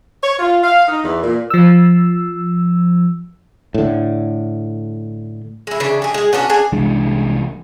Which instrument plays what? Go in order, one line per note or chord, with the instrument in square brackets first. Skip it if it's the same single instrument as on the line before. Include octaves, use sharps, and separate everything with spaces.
[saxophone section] C#5
F4
F5
D#4
E2
A#2
[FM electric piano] F3 E6
[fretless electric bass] A2 D3
[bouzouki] G#3 E4
C#3 E3 D4
G4 G#4
G#3 G#4
B3 C#4 D4 F#4
D4 G#4 G#5
[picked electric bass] C2 E3 G#3 D4